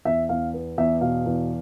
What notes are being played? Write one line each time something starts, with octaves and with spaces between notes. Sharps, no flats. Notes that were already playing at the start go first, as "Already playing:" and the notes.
E2 E5
E2 F5
B3
E2 E5
B2 F5
E2